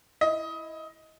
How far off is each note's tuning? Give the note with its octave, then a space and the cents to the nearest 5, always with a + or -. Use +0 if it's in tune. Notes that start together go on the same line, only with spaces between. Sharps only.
E4 +0 D#5 +20